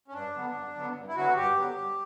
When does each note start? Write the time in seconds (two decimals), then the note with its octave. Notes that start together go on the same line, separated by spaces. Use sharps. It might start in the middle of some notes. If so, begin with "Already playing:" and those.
0.08 C#4
0.13 G2 D4
0.34 D3 F#3 B3
0.54 G2
0.76 D3 F#3 B3
0.96 G2
1.08 E4
1.16 D3 F#3 B3 F#4
1.36 G2 G4
1.57 D3 F#3 B3
1.77 G2